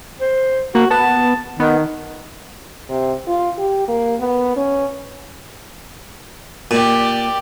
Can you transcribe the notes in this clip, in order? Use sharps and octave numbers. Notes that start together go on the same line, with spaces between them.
C5
A#3 F#4
B3 A5
D#3 B3
C3
F4
G4
A#3
B3
C#4
A#2 G4 D5